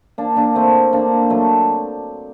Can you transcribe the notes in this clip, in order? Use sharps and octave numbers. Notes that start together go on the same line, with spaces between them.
A#3 D4
A#3 D4
A3 C4
A#3 D4
F#3 A3